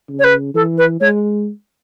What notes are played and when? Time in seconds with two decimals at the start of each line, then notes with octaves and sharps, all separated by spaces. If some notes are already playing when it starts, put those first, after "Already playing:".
0.09 C#3
0.19 C#5
0.24 B4
0.54 E3 A4
0.77 B4
1.00 G#3 C#5